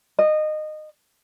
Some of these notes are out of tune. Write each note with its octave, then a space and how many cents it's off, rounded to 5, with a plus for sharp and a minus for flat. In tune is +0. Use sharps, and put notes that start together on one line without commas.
D#5 -20